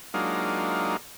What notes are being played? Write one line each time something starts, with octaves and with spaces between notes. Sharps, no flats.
F#3 G#3 A#3 D4 D#4 F4